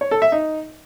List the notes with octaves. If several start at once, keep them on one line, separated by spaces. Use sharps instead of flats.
C#5
A4
E5
D#4